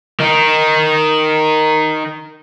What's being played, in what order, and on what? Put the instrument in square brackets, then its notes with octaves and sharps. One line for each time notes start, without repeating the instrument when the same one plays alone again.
[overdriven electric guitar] D#3 D#4